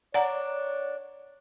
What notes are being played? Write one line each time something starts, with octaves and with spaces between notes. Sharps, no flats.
D4 C#5 D5 F#5 A#5